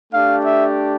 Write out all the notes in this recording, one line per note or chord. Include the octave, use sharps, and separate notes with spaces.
A3 D4 G4 F5
E5